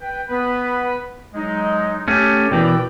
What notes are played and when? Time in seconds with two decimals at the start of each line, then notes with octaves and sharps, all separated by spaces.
0.01 B4 G5
0.28 B3 B4
1.34 F#3 G#3 D#4
2.08 A3 C#4 G4
2.51 B2 E3 A#4 D5 G5